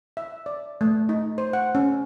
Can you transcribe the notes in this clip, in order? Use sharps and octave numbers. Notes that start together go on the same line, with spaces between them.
E5
D5
A3
D#4
C5
F#5
C#4